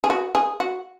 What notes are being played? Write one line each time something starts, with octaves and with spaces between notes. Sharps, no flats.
G#4
F#4
G#4
F#4